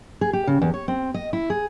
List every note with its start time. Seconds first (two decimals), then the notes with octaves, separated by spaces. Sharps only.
0.21 G#4
0.33 G4
0.47 C#3
0.61 E2
0.74 C#5
0.88 C4
1.14 D#5
1.33 E4
1.50 G#4